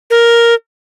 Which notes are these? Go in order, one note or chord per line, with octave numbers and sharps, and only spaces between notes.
A#4